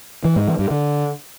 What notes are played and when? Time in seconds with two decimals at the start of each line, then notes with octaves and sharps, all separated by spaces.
0.25 E3
0.36 G#2
0.47 E3
0.59 G2
0.70 D3